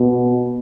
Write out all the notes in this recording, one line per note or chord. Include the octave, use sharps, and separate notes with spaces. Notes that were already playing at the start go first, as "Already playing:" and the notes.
Already playing: B2